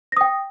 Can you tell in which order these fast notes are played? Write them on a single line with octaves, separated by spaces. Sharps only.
A#6 D#6 G5